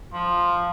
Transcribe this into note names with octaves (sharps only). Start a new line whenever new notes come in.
F3